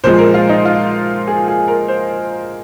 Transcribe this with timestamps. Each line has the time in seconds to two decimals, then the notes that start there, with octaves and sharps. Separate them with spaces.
0.04 A#2 F3 G#3 C5
0.18 A#4
0.34 F4
0.49 D#4
0.65 F4
1.28 G#4
1.48 G#4
1.68 A#4
1.88 C5